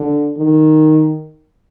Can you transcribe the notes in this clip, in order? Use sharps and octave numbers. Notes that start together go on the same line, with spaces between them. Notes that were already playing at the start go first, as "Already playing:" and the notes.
Already playing: D3
D#3